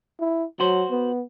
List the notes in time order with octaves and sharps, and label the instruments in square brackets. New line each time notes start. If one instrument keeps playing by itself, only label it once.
[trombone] E4
[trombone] F#3 [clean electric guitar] F#4 C5
[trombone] B3